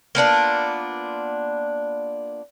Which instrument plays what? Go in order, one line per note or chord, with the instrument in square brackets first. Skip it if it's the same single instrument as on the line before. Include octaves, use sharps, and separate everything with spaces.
[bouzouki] A#3 B3 D4 F4